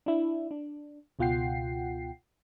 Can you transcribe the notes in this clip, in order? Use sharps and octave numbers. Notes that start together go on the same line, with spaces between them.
D4 E4
D4
C#2 B2 F4 F#5 G5 C7